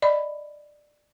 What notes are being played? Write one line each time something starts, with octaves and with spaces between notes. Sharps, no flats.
D5 D#5 B5